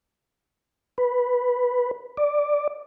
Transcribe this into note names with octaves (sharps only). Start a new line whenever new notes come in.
B4
D5